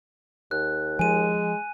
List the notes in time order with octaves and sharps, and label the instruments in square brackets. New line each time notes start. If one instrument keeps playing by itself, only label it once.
[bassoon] D#2 [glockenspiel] F#6
[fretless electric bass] F3 [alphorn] G#3 [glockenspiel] G#5 D#7